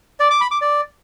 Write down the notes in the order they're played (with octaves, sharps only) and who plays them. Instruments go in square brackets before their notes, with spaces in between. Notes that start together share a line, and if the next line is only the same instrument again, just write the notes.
[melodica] D5
D6
B5
D6
D5